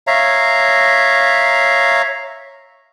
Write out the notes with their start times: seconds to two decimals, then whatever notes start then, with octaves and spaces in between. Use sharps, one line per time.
0.07 C#5 E5 F5 A#5